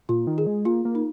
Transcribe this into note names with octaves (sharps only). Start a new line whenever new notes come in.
A#2 F4
D#3
G#4
G#3
A#3 F4
A#3
D#4